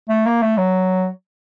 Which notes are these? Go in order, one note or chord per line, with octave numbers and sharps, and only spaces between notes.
A3
A#3
A3
F#3